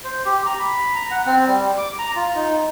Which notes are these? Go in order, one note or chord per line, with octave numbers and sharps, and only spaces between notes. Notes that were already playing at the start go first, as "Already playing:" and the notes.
C5
G4
A#5
B5
A#5
F#5
C4
G3
D6
A#5
F4
D#4